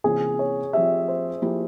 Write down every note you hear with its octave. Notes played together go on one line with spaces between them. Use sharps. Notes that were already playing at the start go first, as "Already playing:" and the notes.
C3 E3 A#3 C#4 F4 G#4
C#5
F3 C4 G4 E5
C5
F3 A#3 E4 G4